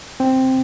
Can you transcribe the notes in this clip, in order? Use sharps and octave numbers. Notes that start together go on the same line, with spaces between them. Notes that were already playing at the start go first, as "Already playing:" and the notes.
C4